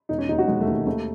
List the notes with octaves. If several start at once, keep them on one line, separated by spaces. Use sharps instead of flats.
E1 D#4
C#4
D#2 D#3 D#4
F#4
E1 G#3
A3
D#2 D#3
D#2 A3